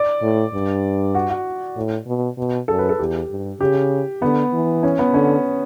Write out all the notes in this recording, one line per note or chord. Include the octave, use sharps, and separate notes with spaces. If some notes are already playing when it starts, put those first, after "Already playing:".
Already playing: D5
A2
G2
F#4
F#4
A2
B2
B2
F#2 A4
B4
A4
E2 G4
G2
C#3 G4
D3 B3
E3
C#4
B3
D3 C#4